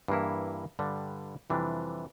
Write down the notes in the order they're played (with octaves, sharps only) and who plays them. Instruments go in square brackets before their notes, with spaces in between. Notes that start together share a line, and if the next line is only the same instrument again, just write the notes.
[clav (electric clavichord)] G2 E3 A#3 E4
G2 D3 G3 D4
F2 C3 E3 G3 D4